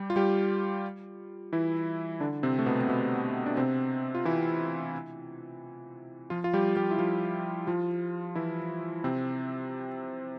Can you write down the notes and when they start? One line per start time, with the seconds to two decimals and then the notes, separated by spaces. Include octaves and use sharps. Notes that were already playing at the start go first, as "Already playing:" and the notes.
Already playing: G3 G4
0.10 F4
0.16 G3 G4
1.53 E3 E4
2.20 D3 D4
2.43 C3 C4
2.58 A3
2.66 B2 B3
2.81 C4
2.89 B2 B3
3.46 D4
3.57 C3 C4
4.15 F4
4.25 E3 E4
6.30 F3 F4
6.44 F4
6.54 G3 G4
6.76 G3 G4
6.91 E4
6.98 F3 F4
7.67 F3 F4
8.35 E3 E4
9.04 C3 C4